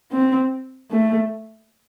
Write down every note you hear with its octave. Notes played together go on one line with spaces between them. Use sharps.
C4
A3